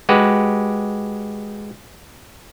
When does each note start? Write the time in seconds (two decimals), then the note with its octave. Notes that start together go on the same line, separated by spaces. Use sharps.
0.09 G#3 F#4 G4 B4